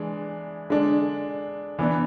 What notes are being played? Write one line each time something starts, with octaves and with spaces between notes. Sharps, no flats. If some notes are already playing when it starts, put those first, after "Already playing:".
Already playing: E3 G#3 D4
D3 G#3 D4
E3 B3 D4